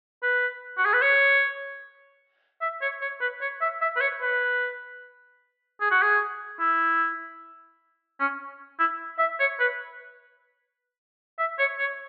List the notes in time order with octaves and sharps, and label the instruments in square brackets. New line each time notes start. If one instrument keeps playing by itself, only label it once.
[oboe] B4
F#4
G#4
B4
C#5
E5
C#5
C#5
B4
C#5
E5
E5
B4
C#5
B4
G#4
F#4
G#4
E4
C#4
E4
E5
C#5
B4
E5
C#5
C#5